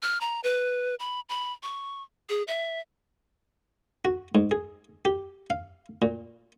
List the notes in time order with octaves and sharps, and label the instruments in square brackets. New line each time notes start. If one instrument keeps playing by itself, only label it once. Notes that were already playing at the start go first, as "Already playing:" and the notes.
[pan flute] F6
A#5
B4
B5
B5
C#6
G#4
E5
[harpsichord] F#4
G#2
G#4
G4
F5
A#2